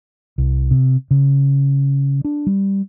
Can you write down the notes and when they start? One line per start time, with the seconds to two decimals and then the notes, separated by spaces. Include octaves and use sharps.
0.38 C2
0.71 C3
1.11 C#3
2.24 D4
2.47 G3